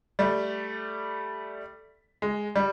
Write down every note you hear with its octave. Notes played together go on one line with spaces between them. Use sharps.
G3 A3
G#3
G3